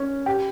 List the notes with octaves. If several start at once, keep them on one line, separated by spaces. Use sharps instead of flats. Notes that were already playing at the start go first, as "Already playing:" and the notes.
Already playing: C#4
G4